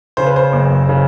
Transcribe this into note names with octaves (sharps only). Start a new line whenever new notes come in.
C#3 C5
B4
C5
F#1
C#3